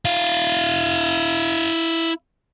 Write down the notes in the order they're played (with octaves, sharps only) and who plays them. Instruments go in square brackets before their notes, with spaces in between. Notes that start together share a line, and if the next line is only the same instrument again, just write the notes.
[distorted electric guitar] E4 F5